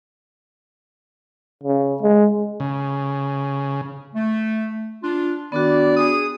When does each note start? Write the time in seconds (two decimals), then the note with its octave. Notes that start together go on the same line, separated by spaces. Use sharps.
1.64 C#3
2.02 G#3
2.60 C#3
4.14 A3
5.03 D4 F4
5.52 D#3 B3 D4 F#4 D5
5.97 G#4 D#6